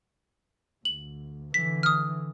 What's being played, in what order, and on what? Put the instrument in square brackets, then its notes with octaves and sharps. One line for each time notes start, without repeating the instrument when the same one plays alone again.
[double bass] D2 [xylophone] F#7
[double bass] D3 E3 [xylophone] B6
[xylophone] D#6 F6